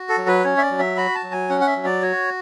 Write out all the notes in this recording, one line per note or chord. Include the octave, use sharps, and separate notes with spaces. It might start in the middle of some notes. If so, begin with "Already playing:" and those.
Already playing: F#4
A4
F#3
B4
C#4 C#5
E5
D5
F#3
E5
F#4 B5
A5
F#3
G#5
C#4 F#5
F#5
E5
F#3
D5
F#4 C#5